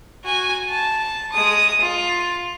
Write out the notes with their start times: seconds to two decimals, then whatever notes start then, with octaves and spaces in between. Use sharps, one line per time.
0.24 F#4 G#5
0.69 A5
1.32 G#3 D#6
1.81 F4